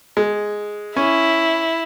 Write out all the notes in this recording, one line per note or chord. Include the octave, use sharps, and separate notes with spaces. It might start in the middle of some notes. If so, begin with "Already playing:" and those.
G#3
C#4 E4